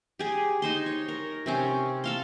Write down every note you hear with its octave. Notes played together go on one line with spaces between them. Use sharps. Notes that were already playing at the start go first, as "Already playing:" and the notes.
G4 G#4
D#4 C5 C6
C#5
A#4
C3 C4 C#4
A4 F5 C6